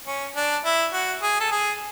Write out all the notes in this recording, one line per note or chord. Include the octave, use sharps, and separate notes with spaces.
C#4
D4
E4
F#4
G#4
A4
G#4